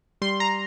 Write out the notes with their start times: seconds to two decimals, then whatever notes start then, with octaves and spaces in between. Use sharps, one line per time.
0.22 G3 C6
0.40 A#5